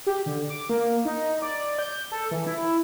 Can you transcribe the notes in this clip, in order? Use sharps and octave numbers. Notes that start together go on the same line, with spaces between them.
G4
D3
D6
A#3
D#4
D5
G6
A4
E3
E4